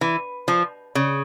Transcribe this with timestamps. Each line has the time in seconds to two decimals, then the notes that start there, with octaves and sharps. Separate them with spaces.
0.01 E3
0.48 F3
0.95 C#3